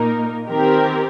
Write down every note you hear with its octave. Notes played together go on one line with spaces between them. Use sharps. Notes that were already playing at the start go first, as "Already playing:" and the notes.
Already playing: A#2 A#3 D#4 A#4
D#3 C4 G4 A#4